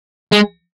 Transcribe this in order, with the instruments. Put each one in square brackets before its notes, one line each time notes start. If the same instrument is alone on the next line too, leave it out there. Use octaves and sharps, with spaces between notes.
[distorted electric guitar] G#3